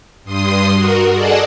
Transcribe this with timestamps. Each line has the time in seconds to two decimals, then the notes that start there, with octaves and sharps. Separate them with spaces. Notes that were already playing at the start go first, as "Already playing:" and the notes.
0.24 G2 C6 D#6
0.73 F#4 A#4
1.12 G#4 A4 D5 D#5 F#5 A5